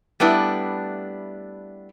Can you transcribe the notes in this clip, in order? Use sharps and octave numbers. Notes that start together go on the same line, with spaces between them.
G3 A3 B3 D4 E4